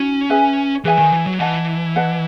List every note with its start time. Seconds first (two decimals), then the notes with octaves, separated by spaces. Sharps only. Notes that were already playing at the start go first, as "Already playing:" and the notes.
Already playing: C#4 D#4 F#4
0.30 G#4 B4 E5 G#5
0.84 E3 G#4 B4 E5 G#5
0.99 D#3
1.13 E3
1.27 F#3
1.40 E3 B4 D#5 F#5 A5
1.96 B4 D#5 F#5 A5